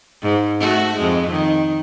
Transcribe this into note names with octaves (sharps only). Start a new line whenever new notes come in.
G#2
A3 F#4
F2 G#3
D#3